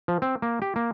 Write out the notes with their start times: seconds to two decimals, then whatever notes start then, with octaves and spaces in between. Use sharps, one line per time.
0.08 F3
0.22 C4
0.42 A#3
0.62 G4
0.76 A#3